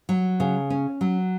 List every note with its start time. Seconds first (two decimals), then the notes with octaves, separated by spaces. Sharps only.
0.09 F#3
0.40 C#3
0.70 C#4
1.01 F#3